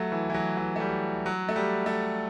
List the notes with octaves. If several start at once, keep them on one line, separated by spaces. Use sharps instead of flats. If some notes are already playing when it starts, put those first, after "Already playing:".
Already playing: F#3 A3
E3
E3
F#3
E3
A3
G3
F#3
A3
G3
A3